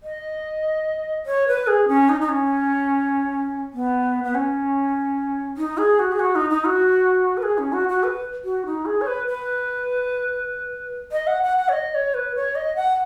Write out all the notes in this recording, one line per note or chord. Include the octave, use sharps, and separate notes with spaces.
D#5
C#5
B4
G#4
C#4
D#4
D#4
C#4
B3
B3
C#4
D#4
G#4
F#4
G#4
F#4
D#4
D#4
F#4
B4
G#4
C#4
F#4
F#4
B4
F#4
D#4
G#4
C#5
B4
B4
D#5
F#5
F#5
F#5
C#5
D#5
C#5
B4
C#5
D#5
F#5